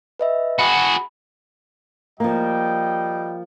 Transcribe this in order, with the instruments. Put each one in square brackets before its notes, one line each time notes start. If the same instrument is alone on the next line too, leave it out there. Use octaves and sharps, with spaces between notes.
[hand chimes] B4 D#5 E5
[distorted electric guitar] F#4 G#4 [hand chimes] B5
[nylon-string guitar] F3 A#3 [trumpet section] G3 D#5 G5